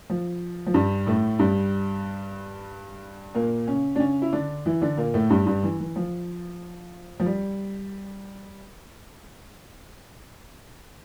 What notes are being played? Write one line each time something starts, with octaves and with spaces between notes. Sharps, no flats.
F3
F3
G2 G3
A2 A3
G2 G3
A#2 A#3
C#3 C#4
D4
C#3 C#4
E4
D3 D4
E3 E4
D3 D4
A#2 A#3
A2 A3
G2 G3
G2 G3
E3
E3
F3
F3
G3